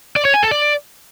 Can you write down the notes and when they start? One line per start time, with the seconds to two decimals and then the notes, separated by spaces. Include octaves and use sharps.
0.16 D5
0.25 C#5
0.34 G#5
0.43 A4
0.51 D5